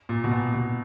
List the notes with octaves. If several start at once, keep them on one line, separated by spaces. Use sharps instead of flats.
A#2
B2
A#2
B2